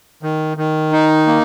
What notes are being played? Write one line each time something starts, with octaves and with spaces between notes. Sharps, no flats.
D#3
D#3
D#4
A#3